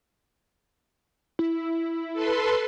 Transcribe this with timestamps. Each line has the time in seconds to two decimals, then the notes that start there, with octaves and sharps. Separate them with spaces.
1.39 E4
2.13 A4 B4 C6